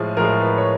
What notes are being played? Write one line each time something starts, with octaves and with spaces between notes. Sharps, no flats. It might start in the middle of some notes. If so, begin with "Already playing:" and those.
Already playing: A2 F3 G#3 G#4
A2 F3 G#3 A#4
B4
C#5